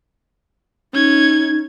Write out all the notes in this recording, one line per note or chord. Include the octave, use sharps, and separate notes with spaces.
C#4 D#4 G#6